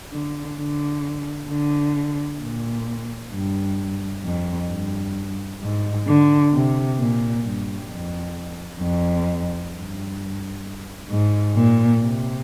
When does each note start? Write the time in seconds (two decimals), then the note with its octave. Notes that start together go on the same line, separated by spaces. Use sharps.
0.13 D3
0.58 D3
1.49 D3
2.41 A#2
3.33 G2
4.25 F2
4.70 G2
5.62 G#2
6.07 D3
6.53 C3
6.99 A#2
7.45 G2
7.90 F2
8.81 F2
9.73 G2
11.10 G#2
11.56 A#2
12.01 C3